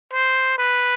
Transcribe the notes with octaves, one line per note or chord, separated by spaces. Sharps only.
C5
B4